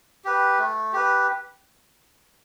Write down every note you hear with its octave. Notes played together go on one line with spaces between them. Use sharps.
G4 B4
A3
G4 B4